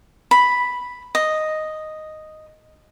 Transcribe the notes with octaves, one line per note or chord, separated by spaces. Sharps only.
B5
D#5